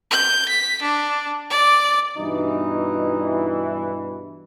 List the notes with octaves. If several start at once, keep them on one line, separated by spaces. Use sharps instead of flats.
G6
B6
D4
D5
G2 B2 E3 D#4